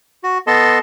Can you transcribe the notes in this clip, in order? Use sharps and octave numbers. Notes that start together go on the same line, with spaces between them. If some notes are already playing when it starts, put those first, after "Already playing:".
F#4
B3 A4 D#5 A5 C6